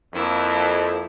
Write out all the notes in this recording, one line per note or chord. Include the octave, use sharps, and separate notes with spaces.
F2 A#3 E4